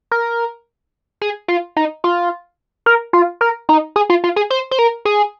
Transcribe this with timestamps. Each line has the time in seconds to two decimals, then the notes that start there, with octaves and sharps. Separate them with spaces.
0.11 A#4
1.21 G#4
1.48 F4
1.76 D#4
2.04 F4
2.86 A#4
3.13 F4
3.41 A#4
3.69 D#4
3.96 G#4
4.10 F4
4.24 F4
4.36 G#4
4.50 C5
4.71 C5
4.79 A#4
5.05 G#4